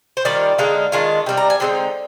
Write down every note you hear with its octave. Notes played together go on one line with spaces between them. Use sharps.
C5
D#3 G3 A#3 F4 D5
D3 G#3 D#4 F5
D#3 G#3 D4 F4
C3 G3 D4 G5
A#5
G#5
D3 G#3 C4 D#4 G5